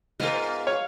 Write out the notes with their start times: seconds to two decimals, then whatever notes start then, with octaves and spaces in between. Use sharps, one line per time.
0.20 G#2 G#3 B3 F4 A#4
0.67 C#5 F5